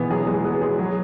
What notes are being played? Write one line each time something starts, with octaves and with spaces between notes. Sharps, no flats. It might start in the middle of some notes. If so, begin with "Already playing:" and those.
Already playing: B2 E3 B3 G#4
F#3 G#4
G#3 G#4
F#3 B3
G#3 G#4
F#3 G#4